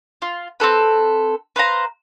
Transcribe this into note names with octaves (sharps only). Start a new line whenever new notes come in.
F4
C4 C#4 A4 B4
B4 C5 F5 A#5